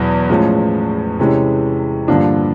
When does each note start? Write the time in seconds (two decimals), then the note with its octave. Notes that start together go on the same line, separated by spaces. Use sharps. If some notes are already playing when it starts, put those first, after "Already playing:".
Already playing: E2 B2 F#3
0.29 A2 F3 G#3 C#4
1.19 C3 E3 G#3 C#4
2.08 G2 D3 F3 A#3 D4